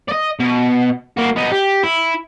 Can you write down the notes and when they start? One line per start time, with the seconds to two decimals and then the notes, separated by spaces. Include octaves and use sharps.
0.08 D5 D#5
0.40 B2
1.17 A#3 F#4
1.36 B3 D#4
1.52 G4
1.84 E4